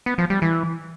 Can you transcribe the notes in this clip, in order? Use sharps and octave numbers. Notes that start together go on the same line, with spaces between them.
B3
F3
G3
E3